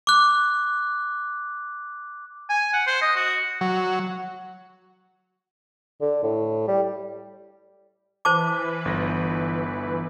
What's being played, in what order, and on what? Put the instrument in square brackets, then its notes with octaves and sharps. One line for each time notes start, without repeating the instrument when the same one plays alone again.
[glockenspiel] D6 F#6
[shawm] G#5
F#5
C5
D#5
F#4
[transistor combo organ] F#3
[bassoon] D3
A2
G3
[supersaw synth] E3 B4 [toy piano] C5 A5 D6
[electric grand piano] G1 A#6